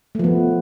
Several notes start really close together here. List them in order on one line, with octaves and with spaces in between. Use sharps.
A3 F3 B3